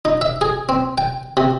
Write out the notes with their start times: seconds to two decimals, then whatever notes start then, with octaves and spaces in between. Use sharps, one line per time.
0.05 D#4
0.21 E5
0.41 G#4
0.69 C4
0.98 G5
1.37 C3